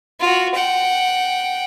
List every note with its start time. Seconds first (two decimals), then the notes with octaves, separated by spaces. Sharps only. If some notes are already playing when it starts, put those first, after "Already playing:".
0.20 F4 F#4
0.55 F#5 G5